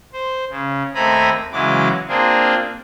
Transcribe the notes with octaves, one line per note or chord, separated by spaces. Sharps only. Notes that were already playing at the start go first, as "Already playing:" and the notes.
C5
C#3
D#2 A3 C4 G#5 A#5 B5
C#3 E3 F#3 G#3 D6
A#3 C4 D4 F4 G#4 A#4